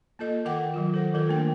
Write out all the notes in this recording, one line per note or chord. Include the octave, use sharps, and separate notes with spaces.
A#3 F4 A4 D#5
D#3 A4 A#4 F#5 G5 D6
D#3 F#3 F4
A4 C5 F#5
D#3 F4 A4 A#4
A3 A#3 D4 G5